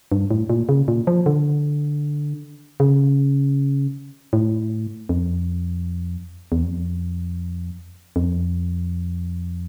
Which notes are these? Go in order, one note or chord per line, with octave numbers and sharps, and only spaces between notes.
G2
A2
A#2
C#3
A#2
F3
D3
C#3
A2
F2
E2
F2
F2